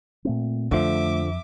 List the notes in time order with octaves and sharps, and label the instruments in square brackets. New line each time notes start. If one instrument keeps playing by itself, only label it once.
[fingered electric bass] A#2 A3 C4
[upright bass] F2 [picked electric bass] D3 F3 [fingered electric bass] A3 [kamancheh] E5 D6